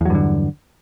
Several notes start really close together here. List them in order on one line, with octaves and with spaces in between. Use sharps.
E2 F#3 G2 D3